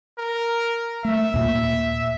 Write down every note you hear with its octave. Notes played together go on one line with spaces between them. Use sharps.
A#4
A3 E5
D#2 A#2 A#3